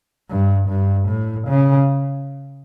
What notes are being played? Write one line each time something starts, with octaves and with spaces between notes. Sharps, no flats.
G2
G2
A2
C#3